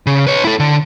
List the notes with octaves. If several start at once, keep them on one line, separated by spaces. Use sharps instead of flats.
C#3
B4 C#5
E4 A4
D3